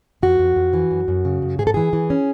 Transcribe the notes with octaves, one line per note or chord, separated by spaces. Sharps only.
F2 F#4
F2
F2
E3
F#2
F#2
C#3
F#2
G#2 G#4
A4
E3 G#4
E3
C#4